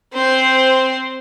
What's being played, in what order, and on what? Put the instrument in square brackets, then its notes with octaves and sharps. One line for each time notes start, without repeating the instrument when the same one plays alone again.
[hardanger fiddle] C4 C5